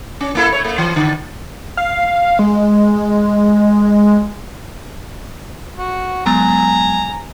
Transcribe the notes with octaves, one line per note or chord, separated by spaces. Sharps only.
C#4
A#3 E4 A4
A3 C#5
A3 A#3
E3
D3
F5
G#3
F#4
F#3 G#3 B3 G#5 A#5